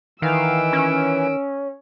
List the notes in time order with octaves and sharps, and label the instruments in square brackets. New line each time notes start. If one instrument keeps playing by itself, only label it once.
[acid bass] D#3 [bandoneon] E3 [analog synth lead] F5 [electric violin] E6 D7
[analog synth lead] C#4